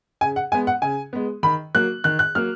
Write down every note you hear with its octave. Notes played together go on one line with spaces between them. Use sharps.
C#3 G#5
F#5
G#3 B3 G#5
F#5
C#3 G#5
G#3 B3
D#3 B5
F#3 A#3 F#6
D#3 F#6
F#6
F#3 A#3 F6